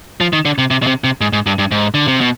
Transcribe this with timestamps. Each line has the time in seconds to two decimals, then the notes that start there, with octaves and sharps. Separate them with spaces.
0.20 F3
0.33 D#3
0.45 D3
0.58 C3
0.71 C3
0.82 B2
0.87 C3
1.04 C3
1.21 G#2
1.33 G#2
1.46 G2
1.59 G2
1.72 G#2
1.94 D3
2.07 C3
2.21 B2